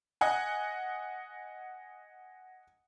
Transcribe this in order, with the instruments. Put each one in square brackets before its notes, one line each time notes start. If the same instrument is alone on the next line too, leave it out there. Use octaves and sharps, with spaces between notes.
[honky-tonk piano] D#5 F#5 G#5